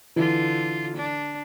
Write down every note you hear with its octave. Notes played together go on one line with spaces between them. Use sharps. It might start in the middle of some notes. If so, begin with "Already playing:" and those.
D3 E3 F4
D4